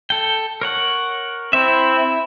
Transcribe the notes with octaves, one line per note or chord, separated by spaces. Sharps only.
A4 G5
A#4 C#5 F#5
C4 E4 E5